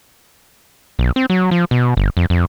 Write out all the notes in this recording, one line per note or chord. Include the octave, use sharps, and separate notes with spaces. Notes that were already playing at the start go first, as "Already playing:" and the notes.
B1
C4
F#3
F3
B2
G1
F2
F2